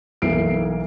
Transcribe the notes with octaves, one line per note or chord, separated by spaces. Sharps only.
B1 E3 A#3 C7 D7